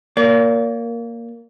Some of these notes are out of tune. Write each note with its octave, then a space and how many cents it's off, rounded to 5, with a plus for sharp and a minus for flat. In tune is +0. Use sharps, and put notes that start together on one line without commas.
A#3 +0 D5 -45